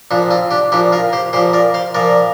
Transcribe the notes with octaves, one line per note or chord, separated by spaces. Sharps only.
A#2 F3 D4
C4 F4
D4 G4
A#2 F3 D4 G4
F4 A#4
G4 C5
A#2 F3 G4 C5
A#4 D5
C5 F5
A#2 F3 A#4 D5